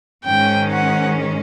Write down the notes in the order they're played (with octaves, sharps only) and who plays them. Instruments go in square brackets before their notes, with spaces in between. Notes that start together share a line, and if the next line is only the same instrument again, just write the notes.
[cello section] G#2 D#3 G#3 C#4 [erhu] G5
[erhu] F#5